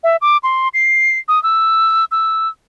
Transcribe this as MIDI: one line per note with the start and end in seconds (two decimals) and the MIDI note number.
0.04 0.16 76
0.21 0.37 86
0.43 0.68 84
0.74 1.18 96
1.28 1.41 87
1.43 2.05 88
2.11 2.49 88